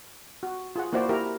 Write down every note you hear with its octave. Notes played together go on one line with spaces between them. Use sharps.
F#4
F4 G#4 F#5
A#3 E4 F#4 C5 D5
E4 G4 A#4